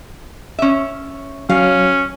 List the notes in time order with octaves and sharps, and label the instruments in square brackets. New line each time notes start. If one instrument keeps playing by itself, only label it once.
[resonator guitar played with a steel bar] C#4 E5
[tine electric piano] F#3 [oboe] C#4 [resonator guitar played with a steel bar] F5